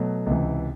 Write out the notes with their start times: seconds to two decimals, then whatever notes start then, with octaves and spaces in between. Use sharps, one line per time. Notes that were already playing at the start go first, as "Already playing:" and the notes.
Already playing: B2 F#3 A3
0.26 C#2 C3 E3